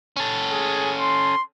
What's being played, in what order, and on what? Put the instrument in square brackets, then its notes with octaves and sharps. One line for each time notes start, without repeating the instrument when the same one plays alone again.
[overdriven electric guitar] C#4 A4
[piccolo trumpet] G#4
C6